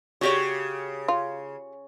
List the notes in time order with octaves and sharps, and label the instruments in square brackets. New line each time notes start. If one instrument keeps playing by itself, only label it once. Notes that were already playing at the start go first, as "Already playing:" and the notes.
[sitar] C#3 [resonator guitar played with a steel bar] F#4 G4 C#5
[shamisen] F4